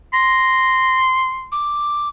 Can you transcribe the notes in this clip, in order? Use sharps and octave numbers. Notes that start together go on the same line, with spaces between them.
C6 A#6
D6